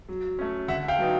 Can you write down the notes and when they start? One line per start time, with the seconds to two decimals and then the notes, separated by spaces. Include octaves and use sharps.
0.09 F#3
0.39 A3 C#4
0.68 D3 E5 F#5
0.88 F5 G5
0.98 F#3 B3 D#4